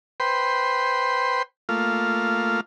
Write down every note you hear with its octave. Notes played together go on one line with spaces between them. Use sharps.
B4 C5 G5 C6
A3 A#3 F4 F5